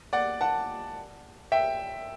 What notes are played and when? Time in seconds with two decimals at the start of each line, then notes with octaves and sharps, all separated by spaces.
0.13 D5 F#5
0.41 F#5 A5
1.52 E5 G5